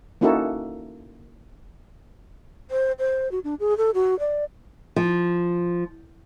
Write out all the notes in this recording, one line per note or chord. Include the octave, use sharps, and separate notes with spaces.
A#3 C#4 D#4 E4 F#4 A4
C5
C5
F#4
D4
G#4
A4
F#4
D5
F3